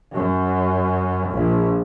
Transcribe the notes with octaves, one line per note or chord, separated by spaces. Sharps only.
F#2
A#1